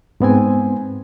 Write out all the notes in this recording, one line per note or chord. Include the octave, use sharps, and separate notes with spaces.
G#2 B3 C4 G#5